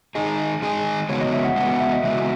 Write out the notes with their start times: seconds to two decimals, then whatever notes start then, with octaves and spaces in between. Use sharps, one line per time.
0.15 D#3 G#3 D#4 G#4 D#5
0.62 D#3 G#3 D#4 G#4
1.09 E2 C#3 G#3 B3 F#4 C#5
1.21 D#5
1.32 E5
1.44 F#5
1.56 E2 C#3 G#3 B3 F#4 F#5
1.80 E5
1.92 D#5
2.03 E2 C#3 G#3 B3 F#4 E5